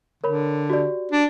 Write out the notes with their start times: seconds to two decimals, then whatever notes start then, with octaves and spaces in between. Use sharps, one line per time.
0.24 D3 A#4 C#5 B5
0.70 F#4 G4 D5
1.12 D4